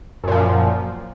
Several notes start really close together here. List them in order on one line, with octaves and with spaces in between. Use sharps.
F#2 A#2 F3